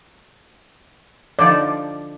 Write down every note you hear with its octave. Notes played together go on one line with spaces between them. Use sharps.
D3 F3 D#4 D5